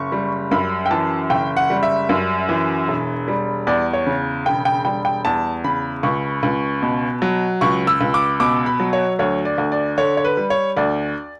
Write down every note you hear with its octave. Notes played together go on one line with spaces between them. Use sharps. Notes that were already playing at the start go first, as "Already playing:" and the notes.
Already playing: F#1 C#6
G3
F#2 B5
G5
E3 A5
F#1 G5
F#5
G3
E5
F#2
E3
E1
G3
E2 D5
C#5
C#3
E1 G5
G5
G3 G5
G5
E2 A5
C#3 B5
C#2 C#6
C#2
B2
F#3
C#2 C#6
E6
C#2
D6
B2 D6
B5
F#3
C#5
D2 C#5
D5
D2
D5
D3 C#5
C#5
B4
G3
C#5
D2 D5